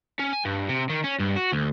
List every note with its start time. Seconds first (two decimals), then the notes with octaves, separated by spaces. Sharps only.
0.19 C#4
0.33 G#5
0.45 G2
0.69 C3
0.90 D#3
1.04 C#4
1.20 G2
1.36 F#4
1.52 D2